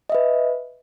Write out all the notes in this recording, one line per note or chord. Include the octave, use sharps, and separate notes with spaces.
B4 D#5 E5